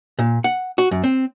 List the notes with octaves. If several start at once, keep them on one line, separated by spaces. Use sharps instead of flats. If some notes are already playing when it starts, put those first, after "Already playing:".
A#2
F#5
F#4
F#2
C4